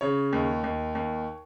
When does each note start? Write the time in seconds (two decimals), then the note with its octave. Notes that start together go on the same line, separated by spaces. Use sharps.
0.01 C#3 C#5
0.33 D#2
0.64 D#2
0.95 D#2